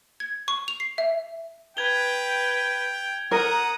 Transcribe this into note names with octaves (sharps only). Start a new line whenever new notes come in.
G#6
C#6
F7
C7
E5
B4 G5 G#6 F7 G7
A#4 F#5 A#5 D#6